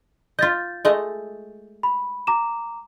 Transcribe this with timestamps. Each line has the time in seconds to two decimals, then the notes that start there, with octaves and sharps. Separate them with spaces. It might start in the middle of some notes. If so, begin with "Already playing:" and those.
0.39 F4 D#5 G6 A6
0.85 G#3 A3 D#5
1.83 B5
2.27 A#5 D6 E7